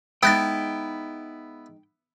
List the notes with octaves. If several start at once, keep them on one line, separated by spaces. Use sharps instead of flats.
G#3 B3 D#4 E4 G5 D#6 F#6 A6